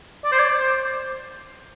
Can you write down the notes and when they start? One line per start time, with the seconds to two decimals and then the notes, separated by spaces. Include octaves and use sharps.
0.24 D5
0.32 C5
0.39 D5
0.59 C5